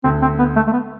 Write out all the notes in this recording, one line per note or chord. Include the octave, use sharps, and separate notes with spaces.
D2 D3 C4
C4
B3
A3
A3
B3